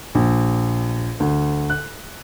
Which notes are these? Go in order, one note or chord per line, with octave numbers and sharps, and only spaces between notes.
A#1
D2
F#6